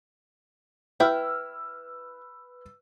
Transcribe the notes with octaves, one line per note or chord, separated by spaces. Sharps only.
E4 B4 G5 E6 F6